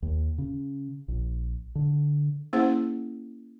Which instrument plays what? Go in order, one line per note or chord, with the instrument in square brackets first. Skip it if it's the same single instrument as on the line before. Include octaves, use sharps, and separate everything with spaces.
[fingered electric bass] D#2
C#3
A#1
D3
[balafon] A#3 C#4 E4 G#4 C5 F#5